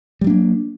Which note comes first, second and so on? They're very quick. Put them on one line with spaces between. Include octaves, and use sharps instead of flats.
G3 F#3 D4 A#3